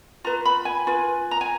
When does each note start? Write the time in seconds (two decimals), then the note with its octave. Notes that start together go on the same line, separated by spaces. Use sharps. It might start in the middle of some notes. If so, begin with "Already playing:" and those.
0.24 F4 B4 A#5
0.45 B5
0.65 G#5
0.87 F4 B4
1.31 A#5
1.41 G#5